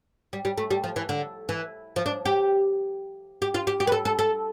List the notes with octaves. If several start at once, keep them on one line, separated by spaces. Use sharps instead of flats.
G3
G3
A3
G3
F3
E3
D3
E3
F3
D4
G4
G4
F4
G4
G4
B4
A4
A4
A4